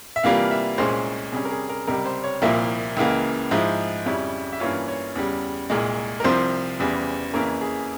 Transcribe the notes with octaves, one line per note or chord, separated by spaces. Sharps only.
E5
C3 E3 G3 A#3 F4 F5
E5
C2 A#2 G#3 C#4 C5
C3 G3 C#4 G#4
A#4
G#4
A#4
C#2 C3 G3 A#4
C5
C#5
C2 A#2 F3 A#3 E4 E5
C#2 C#3 E3 A#3
G#2 F3 G#3 E4
F2 C#3 G3 C#4 E4
E5
G2 E3 A#3 C#4 F4 C#5
C#5
E2 C#3 G3
C2 A#2 G#3
A#4
C2 C3 F3 C5
E2 C#3 E3 G3
F2 C#3 E3 A#3 C#4 A#4
G#4